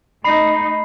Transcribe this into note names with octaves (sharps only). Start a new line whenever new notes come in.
A3 D#4 B5 C7